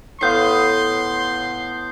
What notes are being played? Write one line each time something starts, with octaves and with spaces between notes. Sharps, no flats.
A2 B3 F5 C6 G6 C7